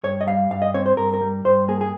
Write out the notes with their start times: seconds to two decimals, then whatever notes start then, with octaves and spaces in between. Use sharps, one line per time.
0.04 G2 C#5
0.21 D#5
0.27 G3 F5
0.50 G2 F5
0.62 D#5
0.74 C4 C#5
0.86 C5
0.97 G2 A#4
1.14 A#4
1.21 G3
1.45 G2 C5
1.68 A#3 G#4
1.81 G#4